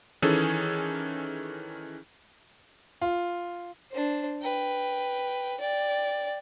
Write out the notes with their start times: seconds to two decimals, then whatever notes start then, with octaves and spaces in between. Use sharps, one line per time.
0.22 D#3 E3 C#4 G#4 A4
3.02 F4
3.91 D4 C5
4.42 B4 G5
5.60 D5 G5